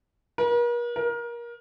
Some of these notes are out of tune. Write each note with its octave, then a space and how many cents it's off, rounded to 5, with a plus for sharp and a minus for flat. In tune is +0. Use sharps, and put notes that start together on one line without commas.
A#4 +45
A#4 +25